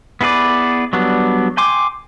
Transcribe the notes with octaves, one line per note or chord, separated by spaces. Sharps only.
B3 E4 G#4 B4 D5
F#3 G3 B3 D4
G5 G#5 C6 D6